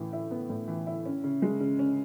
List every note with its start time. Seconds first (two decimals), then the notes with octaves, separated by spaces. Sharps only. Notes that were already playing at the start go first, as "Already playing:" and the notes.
Already playing: A2 E3
0.12 E4
0.31 B3
0.50 A2
0.68 E3
0.86 E4
1.05 C#4
1.24 C#3
1.42 G#3
1.60 C#3
1.79 C#4